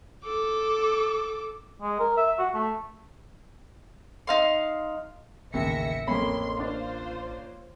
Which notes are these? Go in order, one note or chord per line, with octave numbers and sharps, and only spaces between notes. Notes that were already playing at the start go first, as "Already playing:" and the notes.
A4 D6
G#3
A#4
E5
F#4
A3
D#4 F5 C6
A1 D#2 C#3 E5 A#6 C#7
F2 A#3 C#4 B5 C6
D4 F4 C5